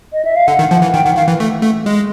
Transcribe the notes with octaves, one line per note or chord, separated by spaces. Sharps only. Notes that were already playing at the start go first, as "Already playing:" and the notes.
D#5
E5
F5
D3 F#5
D#3
F3
E3
D#3 G5
D#3 F#5
D#3 F5
E3
A3
A3
G#3